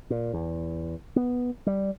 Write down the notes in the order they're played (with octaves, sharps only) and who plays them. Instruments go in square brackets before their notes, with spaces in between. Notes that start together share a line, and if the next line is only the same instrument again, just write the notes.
[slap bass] A#2
E2
B3
G3